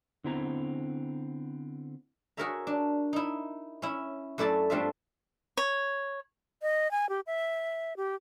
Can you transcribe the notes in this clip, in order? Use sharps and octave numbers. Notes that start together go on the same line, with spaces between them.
D3 B3 C4 E4 A#5
F#4 G#4 A#4 C#5 E5 A#5
D4
D#4 E4
C#4 E4
F#2 A3 E4 D5 A5
G2 A3 C4 D4 F4 E5
C#5
D#5
G#5
G4
E5
G4